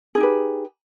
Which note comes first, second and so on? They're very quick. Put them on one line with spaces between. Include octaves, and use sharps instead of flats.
G#4 D#4 G4 B4